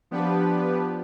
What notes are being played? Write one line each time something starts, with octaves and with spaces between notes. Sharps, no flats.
F3 B3 D4 G4 B4